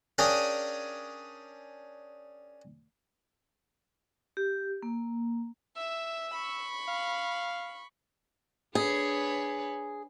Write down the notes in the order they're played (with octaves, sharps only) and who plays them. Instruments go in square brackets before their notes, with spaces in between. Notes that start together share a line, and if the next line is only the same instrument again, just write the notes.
[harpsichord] C#4 D4 G#4 A#4 F5 G5
[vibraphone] G4
A#3
[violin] E5 [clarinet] E6
[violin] B5 C#6
[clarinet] F5
[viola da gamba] D4 B4 C#5 [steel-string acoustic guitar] G#4